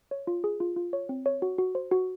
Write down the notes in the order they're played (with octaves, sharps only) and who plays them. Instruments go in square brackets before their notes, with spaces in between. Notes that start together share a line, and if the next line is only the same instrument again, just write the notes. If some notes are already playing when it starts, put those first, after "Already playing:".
[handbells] C#5
F4
G#4
F4
F4
C#5
C4
C#5
F#4
F#4
C5
F#4